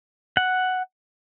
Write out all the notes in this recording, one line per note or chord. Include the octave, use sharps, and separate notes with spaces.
F#5